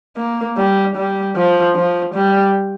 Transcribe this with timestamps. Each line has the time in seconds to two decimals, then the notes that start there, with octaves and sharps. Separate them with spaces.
0.17 A#3
0.57 G3
0.96 G3
1.36 F3
1.75 F3
2.14 G3